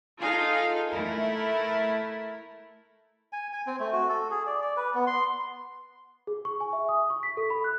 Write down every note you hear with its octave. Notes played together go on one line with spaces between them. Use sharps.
D#4 F4 G#4 A4 F5
A3 E4 A#4
G#5
G#5
C4
A3
F#4
A4
G#4
D5
D5
B4
B3
C6
G#4
C#6
G#5
E5
D#6
C#6
B6
A4
B5
F#6